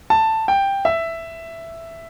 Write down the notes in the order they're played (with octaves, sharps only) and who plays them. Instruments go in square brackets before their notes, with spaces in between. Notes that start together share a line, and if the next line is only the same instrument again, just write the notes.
[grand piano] A5
G5
E5